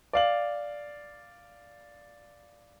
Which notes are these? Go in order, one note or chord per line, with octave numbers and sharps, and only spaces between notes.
D5 F5 F#7